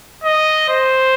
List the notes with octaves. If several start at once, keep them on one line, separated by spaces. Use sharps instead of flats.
D#5
C5